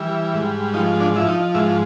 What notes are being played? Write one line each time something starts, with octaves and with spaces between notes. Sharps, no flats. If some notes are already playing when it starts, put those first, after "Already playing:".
Already playing: E3 G3
G#2
F3 D#4
D4
F3 E4
D#4
G#2 E4